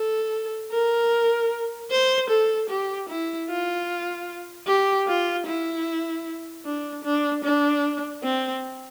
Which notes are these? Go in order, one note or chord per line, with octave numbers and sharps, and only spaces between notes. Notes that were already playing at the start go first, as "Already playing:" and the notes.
Already playing: A4
A#4
C5
A4
G4
E4
F4
G4
F4
E4
D4
D4
D4
C4